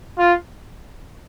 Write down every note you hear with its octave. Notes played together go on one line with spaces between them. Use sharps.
F4